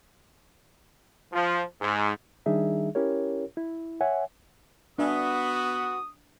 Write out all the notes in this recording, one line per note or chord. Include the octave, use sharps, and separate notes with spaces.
F3
G#2
D#3 G3 D4 D#4 G#4 E5
C#4 E4 G4 A#4 C#5
E4
C#5 E5 F#5 G#5
B3 D4 F#4 E5 G#5 D#6